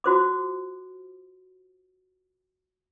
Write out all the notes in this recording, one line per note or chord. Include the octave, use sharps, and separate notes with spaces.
F4 F#4 C5 D6